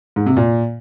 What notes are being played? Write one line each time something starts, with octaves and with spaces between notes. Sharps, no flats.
G#2
C3
A#2